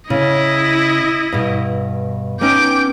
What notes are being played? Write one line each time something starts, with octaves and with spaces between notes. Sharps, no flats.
C#3 E4 D#5
G2 B2
B3 C#4 D#4 G5 D6